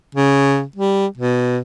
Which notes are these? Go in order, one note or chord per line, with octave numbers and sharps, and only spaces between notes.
C#3
G3
B2